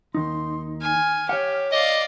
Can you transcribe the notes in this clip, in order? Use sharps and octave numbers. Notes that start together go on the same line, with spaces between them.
D#2 D#4 C6
G#5 F6
G4 C#5 F#5
D5 D#5 F5 D6